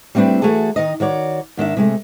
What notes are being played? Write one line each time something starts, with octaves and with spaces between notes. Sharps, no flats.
G3 A3 C4 D4 E4 B4
E3 F#3 A3 F#4 G#4 A4
D#3 D#4 D#5
D#3 F#4 C#5 D5
G#2 D#3 D4 E5
C3 G#3 A3